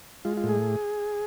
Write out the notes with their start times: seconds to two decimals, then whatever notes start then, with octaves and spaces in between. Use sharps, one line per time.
0.25 G#3 F4
0.37 F4
0.44 A2
0.49 G#4